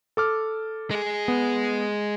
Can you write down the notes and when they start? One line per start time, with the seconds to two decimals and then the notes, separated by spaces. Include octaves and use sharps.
0.17 A4 D6 F6
0.91 G#3 G#4
1.28 B3